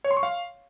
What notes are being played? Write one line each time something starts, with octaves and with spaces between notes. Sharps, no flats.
C#5
C6
C#6
F5